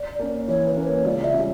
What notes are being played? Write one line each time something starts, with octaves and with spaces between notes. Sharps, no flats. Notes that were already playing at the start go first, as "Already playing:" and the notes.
Already playing: D5
A#3 C#4
E3 C#5
B4
A#3 C#4
C#5
C#2 D5
E5
C#3 G3